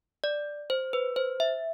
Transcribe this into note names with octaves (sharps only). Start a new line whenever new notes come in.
D5
C5
B4
C5
E5